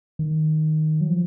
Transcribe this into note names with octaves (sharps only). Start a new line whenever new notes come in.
D#3
F#3
F3